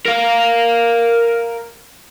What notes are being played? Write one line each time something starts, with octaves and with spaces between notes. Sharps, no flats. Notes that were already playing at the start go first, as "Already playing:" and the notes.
A#4 F5